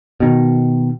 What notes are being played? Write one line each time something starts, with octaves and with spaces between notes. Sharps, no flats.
B2 D#3